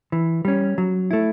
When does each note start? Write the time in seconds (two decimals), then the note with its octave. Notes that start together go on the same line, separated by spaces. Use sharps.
0.12 E3
0.45 G3 C#4
0.78 F#3
1.11 A3 E4